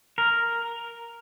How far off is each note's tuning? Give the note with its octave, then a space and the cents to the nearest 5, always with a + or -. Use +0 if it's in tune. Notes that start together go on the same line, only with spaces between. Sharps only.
A#4 +0